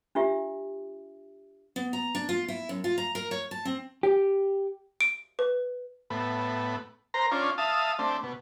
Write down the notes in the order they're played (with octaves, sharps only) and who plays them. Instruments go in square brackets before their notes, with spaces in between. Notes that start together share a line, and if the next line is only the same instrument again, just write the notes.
[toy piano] D4 F4 G4 E5
[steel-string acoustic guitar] B3
A#5
D4
F4
E4
F#2
F4
A#5
A#4
C#5
A5
C4
[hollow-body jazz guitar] G4
[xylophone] D7
B4
[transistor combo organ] A2 B3
A#4 C5 A#5
C#4 D4 F4
E5 F5 A5 D#6
A3 C4 D4
B2